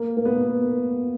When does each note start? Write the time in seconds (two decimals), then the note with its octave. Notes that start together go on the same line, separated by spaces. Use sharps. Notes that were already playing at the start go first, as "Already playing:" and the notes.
Already playing: A#3
0.17 A#3
0.25 B3